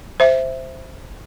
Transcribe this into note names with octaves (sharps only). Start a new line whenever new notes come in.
C5 E5